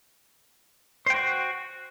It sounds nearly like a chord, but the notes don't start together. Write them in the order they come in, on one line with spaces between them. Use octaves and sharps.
C5 G5 F#4